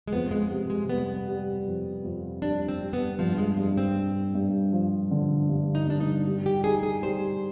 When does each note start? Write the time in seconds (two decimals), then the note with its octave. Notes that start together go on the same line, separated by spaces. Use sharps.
0.08 G#3
0.13 F2 B3
0.31 G#3
0.51 C3
0.70 G#3
0.89 G3 B3
1.28 G3
1.66 F2
2.04 F2
2.42 G3 D4
2.68 C4
2.81 G3
2.93 B3
3.19 G2 F3
3.38 G#3
3.57 G2 G#3
3.78 C4
3.96 G2
4.35 G2
4.72 F3
5.11 D3
5.49 G2
5.75 D#4
5.88 G2 D4
6.00 D#4
6.26 G3
6.46 G4
6.64 D#4 G#4
6.83 G#4
7.03 G3 C5